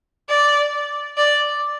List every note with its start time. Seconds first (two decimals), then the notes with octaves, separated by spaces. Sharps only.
0.29 D5
1.17 D5